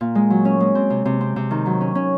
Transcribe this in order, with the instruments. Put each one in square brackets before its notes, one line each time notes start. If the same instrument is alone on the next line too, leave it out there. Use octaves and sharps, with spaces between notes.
[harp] A#2
G#3
F#3
C#4
G#3
C4
C3
C3
C4
C3
D#3
F#3
C#4
C#4